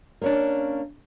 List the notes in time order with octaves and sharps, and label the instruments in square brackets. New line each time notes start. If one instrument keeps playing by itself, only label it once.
[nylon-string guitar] A#3 C#4 D4